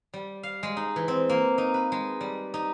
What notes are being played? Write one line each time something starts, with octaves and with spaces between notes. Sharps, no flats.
G3
F5
G#3
D#4
E3
C4
A#3
D#4
B4
G#3
G3
D#4